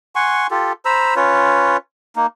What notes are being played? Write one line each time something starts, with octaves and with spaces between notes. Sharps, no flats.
F#5 G#5 C6 C#6
F4 G4 A4
C5 A#5 B5 E6
C#4 F4 B4 C#5
A#3 D#4